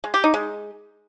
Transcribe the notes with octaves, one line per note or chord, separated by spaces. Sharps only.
G#3
G4
D#4
G#3